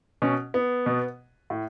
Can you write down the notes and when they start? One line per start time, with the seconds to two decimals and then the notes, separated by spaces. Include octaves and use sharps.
0.22 B2 C#4
0.54 B3
0.86 B2
1.50 A2